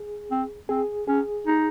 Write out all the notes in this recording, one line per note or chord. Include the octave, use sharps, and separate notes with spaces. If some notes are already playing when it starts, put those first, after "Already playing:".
Already playing: G#4
C4
C4 G#4
C#4 G#4
D#4